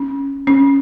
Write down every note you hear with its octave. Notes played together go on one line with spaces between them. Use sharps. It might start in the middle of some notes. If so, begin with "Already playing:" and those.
Already playing: C#4
C#4